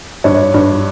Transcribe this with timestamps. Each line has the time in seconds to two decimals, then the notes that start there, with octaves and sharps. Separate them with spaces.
0.24 G2 C#5
0.54 G2